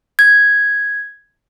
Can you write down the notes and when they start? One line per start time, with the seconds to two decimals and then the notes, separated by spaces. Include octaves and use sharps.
0.19 G#6